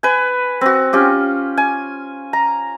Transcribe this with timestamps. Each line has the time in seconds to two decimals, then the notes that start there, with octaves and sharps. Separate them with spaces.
0.03 B4 G#5
0.61 C4 F#4
0.93 C#4 F4 G4
1.57 G#5
2.33 A#5